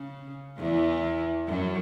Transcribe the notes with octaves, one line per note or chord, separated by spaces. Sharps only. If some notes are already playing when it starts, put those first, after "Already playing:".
Already playing: C#3
E2 E3
F#2 F#3